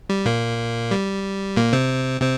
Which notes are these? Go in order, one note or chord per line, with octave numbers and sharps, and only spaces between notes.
G3
A#2 A#3
G3
A#2 A#3
C3 C4
C3 C4